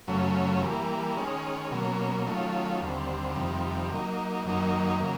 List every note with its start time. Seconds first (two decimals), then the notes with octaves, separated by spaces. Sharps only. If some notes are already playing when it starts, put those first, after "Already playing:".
0.08 F#2 C#3 F#3 A3 C#4
0.62 E3 G3 A#3
1.17 D#3 G#3 C#4
1.71 B2 F#3 A#3 C#4
2.26 D#3 F#3 A3 C#4 F4
2.81 D#2 D3 G3 C4
3.36 F2 C3 D#3 G3
3.90 F#3 A#3 D#4
4.45 F#2 D#3 F#3 A#3 D#4
5.00 C#3 F#3 A#3